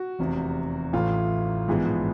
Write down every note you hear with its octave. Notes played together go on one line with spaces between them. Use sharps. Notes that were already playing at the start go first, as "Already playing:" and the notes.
Already playing: F#4
F1 E2 C3
A1 A2 E3 A3 F4
A#1 G#2 E3 G#3 B3